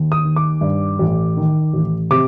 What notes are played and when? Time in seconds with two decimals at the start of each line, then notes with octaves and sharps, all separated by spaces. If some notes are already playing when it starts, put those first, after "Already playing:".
Already playing: D#2
0.12 D#6
0.24 D#3
0.36 D6
0.61 G2
0.99 A1
1.37 D#3
1.73 A1
2.11 C3 D6